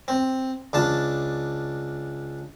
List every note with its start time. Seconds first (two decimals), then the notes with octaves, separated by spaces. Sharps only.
0.08 C4
0.73 C#2 D4 A5